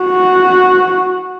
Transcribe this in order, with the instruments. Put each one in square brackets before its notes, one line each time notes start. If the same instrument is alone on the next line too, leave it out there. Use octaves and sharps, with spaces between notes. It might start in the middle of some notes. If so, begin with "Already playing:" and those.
Already playing: [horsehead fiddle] F#4